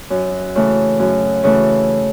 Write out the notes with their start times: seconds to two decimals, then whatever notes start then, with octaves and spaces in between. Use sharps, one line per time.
0.10 F#2
0.55 C#3 E3 A3
0.99 F#2
1.44 C#3 E3 A3